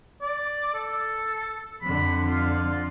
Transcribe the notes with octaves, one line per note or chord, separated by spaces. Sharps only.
D5
A4
F2 D3 B5
F4